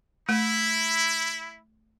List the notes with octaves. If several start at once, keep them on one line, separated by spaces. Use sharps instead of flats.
A3 E4